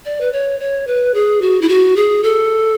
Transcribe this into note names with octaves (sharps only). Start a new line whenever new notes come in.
D5
B4
C#5
C#5
B4
G#4
F#4
E4
F#4
G#4
A4